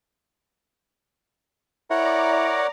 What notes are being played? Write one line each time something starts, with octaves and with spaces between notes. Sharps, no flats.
E4 A#4 C#5 D5 F#5 A#5 D6